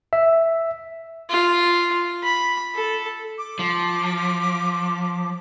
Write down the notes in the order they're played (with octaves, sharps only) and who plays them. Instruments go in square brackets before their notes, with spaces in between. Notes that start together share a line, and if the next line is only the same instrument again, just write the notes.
[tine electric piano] E5
[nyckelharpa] F4
B5
A4
[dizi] D6
[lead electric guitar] F3